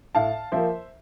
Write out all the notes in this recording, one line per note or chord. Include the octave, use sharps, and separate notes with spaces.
A2 F5 A5
F3 A#3 C5 E5